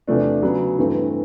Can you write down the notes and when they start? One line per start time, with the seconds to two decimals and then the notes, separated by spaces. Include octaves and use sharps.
0.07 E2 C3 F3 A3 D4
0.43 C#3 F#3 B3
0.78 G2 E3 A3 C4